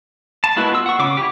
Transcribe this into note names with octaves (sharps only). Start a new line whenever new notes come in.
A5
G#3 A#3 B3 E4 F#4
F4 E6
F#5 C#6
C#3 C#4 D6
E4 G4